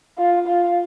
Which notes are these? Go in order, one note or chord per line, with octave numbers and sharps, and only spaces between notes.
F4
F4